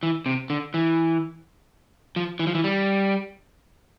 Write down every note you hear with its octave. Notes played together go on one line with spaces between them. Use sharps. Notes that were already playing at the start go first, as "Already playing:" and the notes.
E3
C3
D3
E3
F3
E3
F3
E3
G3